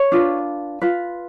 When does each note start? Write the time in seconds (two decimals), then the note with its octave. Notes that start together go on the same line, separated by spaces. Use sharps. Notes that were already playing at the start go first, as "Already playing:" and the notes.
Already playing: C#5
0.12 D4 F4 B4
0.82 F4 B4